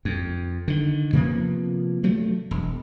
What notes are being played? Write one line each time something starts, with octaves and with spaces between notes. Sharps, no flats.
F2
D3 D#3
C3 F3 A#3 B3
G2 F#3 A3
E1